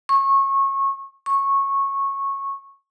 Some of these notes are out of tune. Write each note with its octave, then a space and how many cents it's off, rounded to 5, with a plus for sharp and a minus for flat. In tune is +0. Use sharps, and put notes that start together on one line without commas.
C#6 -25
C#6 -15